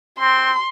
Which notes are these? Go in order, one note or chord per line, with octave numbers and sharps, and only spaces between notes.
C4 C6